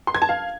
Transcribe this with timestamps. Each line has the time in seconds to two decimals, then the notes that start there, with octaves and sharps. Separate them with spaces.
0.07 C6
0.15 G#6
0.22 A5
0.29 F5